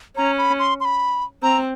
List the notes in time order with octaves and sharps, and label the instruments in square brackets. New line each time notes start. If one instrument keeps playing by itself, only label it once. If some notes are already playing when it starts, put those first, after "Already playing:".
[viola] C#4 [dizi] A#5
[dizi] B5
C6
C6
B5
[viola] C4 [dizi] A#5